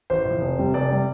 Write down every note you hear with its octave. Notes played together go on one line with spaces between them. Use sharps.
A1 C5
A2 F3
F1
F2 C3 G3
F1 D5
C3 G3